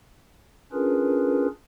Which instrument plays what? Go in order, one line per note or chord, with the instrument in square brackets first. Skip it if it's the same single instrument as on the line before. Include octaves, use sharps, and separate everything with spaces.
[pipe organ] C#4 D4 F4 G#4 A#4 B4